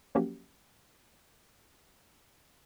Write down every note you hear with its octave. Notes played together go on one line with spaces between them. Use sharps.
F3 F#3 A#3 C#4 F#4 G4